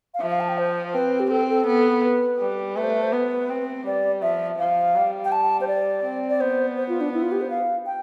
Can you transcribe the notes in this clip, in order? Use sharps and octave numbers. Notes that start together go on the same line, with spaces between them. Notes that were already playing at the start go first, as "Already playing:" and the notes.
F5
F3 E5
F5
A5
G5
C5
C4 B4
G4
C4 A4
A4
B3
B4
G3
A3 B4
C5
B4
C5
B3 B4
C4
G3 D5
F3 E5
F3 F5
G3
G5
A5
C5
D5
C4
D5
B3 C5
C5
F4
D4
E4
F4
G4
C5
F5
G5